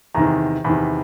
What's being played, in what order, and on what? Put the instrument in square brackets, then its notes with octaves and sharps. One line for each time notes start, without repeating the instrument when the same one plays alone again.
[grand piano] E2 C3 D#3 A#5
E2 C3 D#3 B5